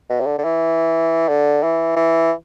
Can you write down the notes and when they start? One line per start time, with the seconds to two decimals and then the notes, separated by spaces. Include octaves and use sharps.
0.10 B2
0.21 C3
0.27 D3
0.39 D3
0.45 E3
1.29 D3
1.63 E3
1.96 E3